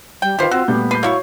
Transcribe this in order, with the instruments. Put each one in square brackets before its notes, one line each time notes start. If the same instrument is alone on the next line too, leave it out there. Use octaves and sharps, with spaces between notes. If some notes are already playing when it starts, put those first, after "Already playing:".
[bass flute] G3 [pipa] G5
[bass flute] D#3 [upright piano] F4 B4 F5 [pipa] G4 C5 [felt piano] B6 C7
[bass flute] C4 [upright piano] F4 E6 [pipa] F#4
[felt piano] A#2 G3 A3 [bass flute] B3 [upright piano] G6
[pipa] B4 [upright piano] G6 C7
[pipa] A#3 E4 C#6 [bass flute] F#4 [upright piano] C#5